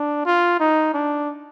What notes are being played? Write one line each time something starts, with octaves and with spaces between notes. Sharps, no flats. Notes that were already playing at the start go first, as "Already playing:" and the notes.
Already playing: D4
F4
D#4
D4